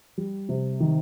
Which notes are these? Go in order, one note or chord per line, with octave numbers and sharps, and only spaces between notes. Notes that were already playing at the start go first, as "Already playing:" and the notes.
G3
C3
D#3